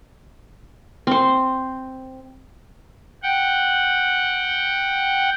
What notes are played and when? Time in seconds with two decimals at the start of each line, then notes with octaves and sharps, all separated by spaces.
1.07 C4 C5
3.23 F#5 G5